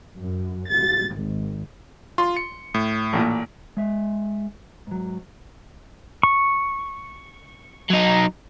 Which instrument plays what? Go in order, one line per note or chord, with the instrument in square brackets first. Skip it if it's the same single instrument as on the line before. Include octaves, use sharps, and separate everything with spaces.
[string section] F#2
A6
G#1
[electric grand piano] F4 [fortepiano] C6
[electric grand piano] C#7
A2
[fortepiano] A1 A#2
[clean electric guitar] G#3 E5
G#2 F#3
[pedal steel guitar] C#6
[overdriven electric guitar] F#3 D#4